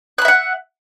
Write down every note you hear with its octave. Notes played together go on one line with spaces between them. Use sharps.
E5 F#5 B5 F#6